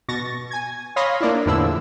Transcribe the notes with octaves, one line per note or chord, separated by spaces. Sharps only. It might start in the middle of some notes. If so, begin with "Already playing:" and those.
B2 C#6 A6 A#6
G#5 G#6
C#5 F5 B5 C6 D#6 A#6
A#3 D4 E4
E2 A2 D3 F3 E4 E6